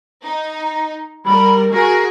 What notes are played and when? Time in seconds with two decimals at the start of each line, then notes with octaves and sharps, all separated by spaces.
0.23 D#4
1.25 G3 A#4 B5
1.71 F#4 G#4 A#4